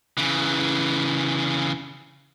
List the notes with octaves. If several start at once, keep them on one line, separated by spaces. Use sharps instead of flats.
C#3 E3